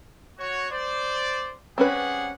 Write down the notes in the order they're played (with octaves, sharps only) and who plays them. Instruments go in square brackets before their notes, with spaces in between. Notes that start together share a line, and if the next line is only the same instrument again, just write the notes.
[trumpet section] F#4 C#5
C5 D5
[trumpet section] G3 G#4 F#5 [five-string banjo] C4 C#4 B4